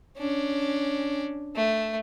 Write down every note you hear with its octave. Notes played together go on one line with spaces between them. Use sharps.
C#4 D4
A3